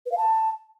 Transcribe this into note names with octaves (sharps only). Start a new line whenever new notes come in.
B4
F5
A5